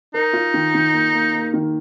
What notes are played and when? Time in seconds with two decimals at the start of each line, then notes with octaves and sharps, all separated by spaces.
0.14 D#4 A#4
0.33 F4
0.54 D#3
0.74 D#3
0.93 A#3
1.14 A#3
1.34 A#3
1.54 D#3